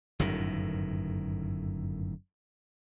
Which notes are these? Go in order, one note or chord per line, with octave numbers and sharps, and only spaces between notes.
G1 F#2 A2 D#3